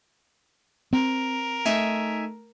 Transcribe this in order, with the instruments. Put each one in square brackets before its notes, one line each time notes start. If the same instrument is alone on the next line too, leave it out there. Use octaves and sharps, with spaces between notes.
[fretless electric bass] C4 [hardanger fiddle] A#4
[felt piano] A3 [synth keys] D#4 E5 G#5